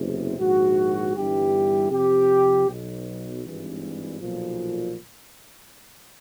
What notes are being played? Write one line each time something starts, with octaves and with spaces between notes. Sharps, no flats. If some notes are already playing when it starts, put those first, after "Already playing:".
Already playing: F#1 E2 C3
A#1 G#2 D#3 F#4
G1 G2 E3 G4
F2 C3 F3 G4
B1 B2
G#1 G2 E3
B1 A#2 F3